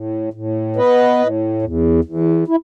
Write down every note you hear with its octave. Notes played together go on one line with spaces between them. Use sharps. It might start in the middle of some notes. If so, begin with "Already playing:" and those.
Already playing: A2
A2
B3 B4 D#5
A2
E2
E2
E4